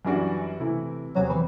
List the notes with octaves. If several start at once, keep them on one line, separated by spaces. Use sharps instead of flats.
F#2 E3 G3 D4 F#4
C3 E3 A3 E4
E2 C3 F#3 G3 C4 G4
E3